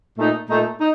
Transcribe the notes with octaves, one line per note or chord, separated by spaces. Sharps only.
A#2 A3 D#4
A#2 A3 D#4
D#4